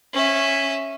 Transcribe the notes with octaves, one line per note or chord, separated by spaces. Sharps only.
C#4 E5